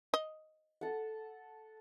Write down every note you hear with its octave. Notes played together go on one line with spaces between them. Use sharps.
D#5
A4 F#5